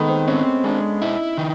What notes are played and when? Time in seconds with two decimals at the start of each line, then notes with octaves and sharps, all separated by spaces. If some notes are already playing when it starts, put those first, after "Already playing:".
Already playing: D#3 G#3 A3 B3
0.08 C4
0.28 C4 C#4
0.64 G#3 D4
1.02 D#4 E4
1.38 D#3